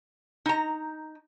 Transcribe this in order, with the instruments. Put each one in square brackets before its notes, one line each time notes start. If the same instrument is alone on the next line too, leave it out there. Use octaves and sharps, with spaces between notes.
[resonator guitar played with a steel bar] D#4 A#5